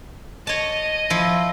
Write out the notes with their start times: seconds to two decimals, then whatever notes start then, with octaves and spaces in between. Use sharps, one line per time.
0.47 C#5 D#5 A5
1.10 F3 E4